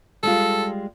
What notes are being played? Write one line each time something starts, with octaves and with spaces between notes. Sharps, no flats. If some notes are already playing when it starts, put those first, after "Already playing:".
G3 G#3 F4 A4